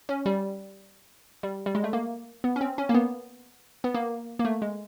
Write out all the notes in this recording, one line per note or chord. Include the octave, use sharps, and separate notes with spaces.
C#4
G3
G3
G3
G#3
A3
A#3
B3
C#4
C4
C#4
A#3
B3
B3
A#3
A#3
A3
G#3